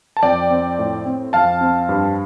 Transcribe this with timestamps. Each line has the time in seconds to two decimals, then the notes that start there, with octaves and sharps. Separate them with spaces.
0.17 A5
0.23 F2 D5 G5
0.50 C4
0.79 A2
1.06 C4
1.33 F2 F5 A5
1.61 C4
1.89 G2